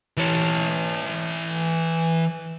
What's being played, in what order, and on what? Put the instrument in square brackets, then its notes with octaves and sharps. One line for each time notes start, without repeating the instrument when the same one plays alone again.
[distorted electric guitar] E3 C#5